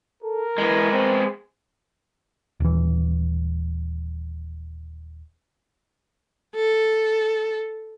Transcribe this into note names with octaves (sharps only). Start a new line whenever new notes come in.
A4 A#4
E3 G#3 B3
C4
D#1 E3
A4